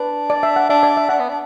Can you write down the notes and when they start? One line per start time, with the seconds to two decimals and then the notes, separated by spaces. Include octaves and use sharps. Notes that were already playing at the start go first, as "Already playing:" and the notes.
Already playing: D4 B4
0.30 D5
0.43 E5
0.56 F#5
0.69 D4 E5
0.83 D5
0.97 E5
1.09 D4 F#5
1.19 B3
1.29 D4